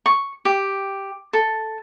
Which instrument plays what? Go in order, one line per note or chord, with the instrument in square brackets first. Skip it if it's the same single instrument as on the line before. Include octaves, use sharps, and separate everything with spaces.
[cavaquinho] C#6
G4
A4